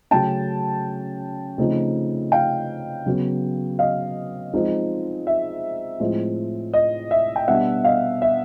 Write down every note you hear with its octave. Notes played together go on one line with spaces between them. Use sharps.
C#3 F#3 A3 C#4 G5 A5
C#3 F3 A3 C4 D#4
F5 G5
C#3 F#3 B3
D#5 F5
F3 G#3 C4 D#4
E5
A2 F3 G#3 C4
D#5
E5
G5
B2 G3 B3 D4 E5 F#5
D#5 F5
E5